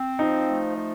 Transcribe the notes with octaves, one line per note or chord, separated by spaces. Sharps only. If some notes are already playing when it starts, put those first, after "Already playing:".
Already playing: C4
F3 D#4
A3
F3